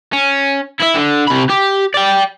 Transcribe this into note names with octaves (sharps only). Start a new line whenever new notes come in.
C#4
E4 E5
D3
C3 B5
G4
D5 G5